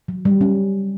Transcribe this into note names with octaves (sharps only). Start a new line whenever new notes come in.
F#3
G3
C#4